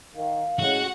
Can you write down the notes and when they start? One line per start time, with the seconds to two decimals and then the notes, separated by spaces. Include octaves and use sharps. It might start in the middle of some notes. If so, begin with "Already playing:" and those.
0.15 D#3 F5
0.59 A2 G#3 C#4 F#4 F#5